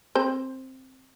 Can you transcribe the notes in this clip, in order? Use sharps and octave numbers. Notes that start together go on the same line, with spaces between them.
C4 C5